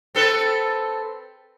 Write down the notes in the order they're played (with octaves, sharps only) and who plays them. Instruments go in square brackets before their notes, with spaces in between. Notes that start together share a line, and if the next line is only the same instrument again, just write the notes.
[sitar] C4 A4 B4